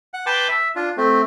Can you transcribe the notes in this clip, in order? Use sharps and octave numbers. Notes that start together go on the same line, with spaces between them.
F#5
B4 G5 A5 C6 D6
E5
D4 F4
A3 C4